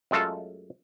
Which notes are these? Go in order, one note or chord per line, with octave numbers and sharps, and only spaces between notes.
F#2 G#3 A3 F4 A4